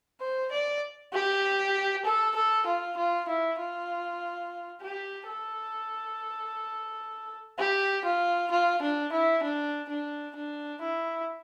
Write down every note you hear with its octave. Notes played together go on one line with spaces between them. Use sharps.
C5
D5
G4
A4
A4
F4
F4
E4
F4
G4
A4
G4
F4
F4
D4
E4
D4
D4
D4
E4